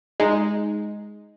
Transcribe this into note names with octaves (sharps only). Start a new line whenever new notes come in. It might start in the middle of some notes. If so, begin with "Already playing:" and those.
G#3 D#4